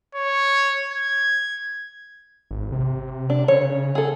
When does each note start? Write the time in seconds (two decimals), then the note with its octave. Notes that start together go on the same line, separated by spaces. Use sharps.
0.15 C#5
0.91 G#6
2.51 G#1
2.72 C3
3.30 D4
3.48 C#3 C#5
3.95 G#4 A4